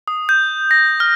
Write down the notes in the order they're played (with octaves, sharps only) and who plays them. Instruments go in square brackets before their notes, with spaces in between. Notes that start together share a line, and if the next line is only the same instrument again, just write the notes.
[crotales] D#6
G6
A#6
F6